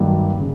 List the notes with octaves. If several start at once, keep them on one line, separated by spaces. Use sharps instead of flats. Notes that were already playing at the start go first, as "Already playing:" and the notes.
Already playing: G2 D#3 F#3 A#3
C#3